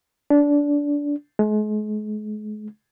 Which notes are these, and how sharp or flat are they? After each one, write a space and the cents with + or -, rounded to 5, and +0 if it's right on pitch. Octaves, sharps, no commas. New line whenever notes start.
D4 -20
G#3 +40